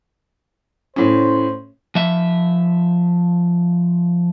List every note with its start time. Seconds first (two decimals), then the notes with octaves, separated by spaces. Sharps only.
0.96 A2 C#4 C5
1.95 F3 E5